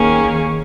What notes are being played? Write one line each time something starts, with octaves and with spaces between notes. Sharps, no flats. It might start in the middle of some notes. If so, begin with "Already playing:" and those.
Already playing: D#2 D#3 A#3 C#4 G#4